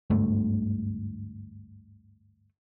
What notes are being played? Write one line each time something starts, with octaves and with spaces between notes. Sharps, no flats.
G1 D2 G#2 A3